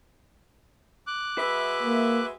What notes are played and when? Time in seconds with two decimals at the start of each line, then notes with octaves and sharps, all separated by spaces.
1.07 D6 F#6
1.38 G#3 F#4 B4 E5
1.83 A#3